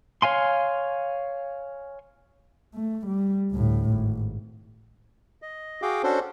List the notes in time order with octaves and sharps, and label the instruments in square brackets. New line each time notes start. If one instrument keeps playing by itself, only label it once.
[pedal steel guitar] C#5 F5 G#5 C6
[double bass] A3
G3
D2 A2
G#1
[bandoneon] D#5
F#4 G#4 F5 G5 D6
C#4 D4 F#4 A4 C5